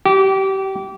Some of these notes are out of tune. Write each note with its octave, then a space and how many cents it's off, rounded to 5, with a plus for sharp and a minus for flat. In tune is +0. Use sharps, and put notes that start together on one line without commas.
G4 -25